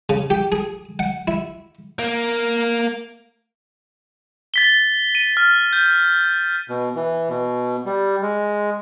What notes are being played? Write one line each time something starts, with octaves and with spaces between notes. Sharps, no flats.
C#3
G4
G#4
F#5
E4
A#3
A6 B6 G7
D#7
F6
G6
B2
E3
B2
G3
G#3